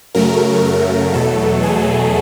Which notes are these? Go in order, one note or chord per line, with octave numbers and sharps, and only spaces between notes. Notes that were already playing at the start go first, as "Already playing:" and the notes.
F#2 C#3 F#3 A3 A#4
A#4
E2 B2 F#3 A3 A4
G#4